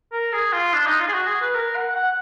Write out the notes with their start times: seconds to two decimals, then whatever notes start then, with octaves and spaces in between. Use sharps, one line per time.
0.12 A#4
0.33 G#4
0.53 F4
0.73 D4
0.86 D#4
1.00 F4
1.08 G#4
1.13 F#4
1.27 G#4
1.41 B4
1.55 A#4
1.76 F#5
1.95 F#5